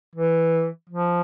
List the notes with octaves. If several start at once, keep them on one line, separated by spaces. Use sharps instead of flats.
E3
F3